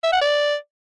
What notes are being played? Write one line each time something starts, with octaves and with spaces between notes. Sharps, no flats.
E5
F#5
D5